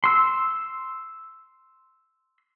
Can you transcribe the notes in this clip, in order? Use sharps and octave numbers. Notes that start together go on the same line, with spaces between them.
C6 E6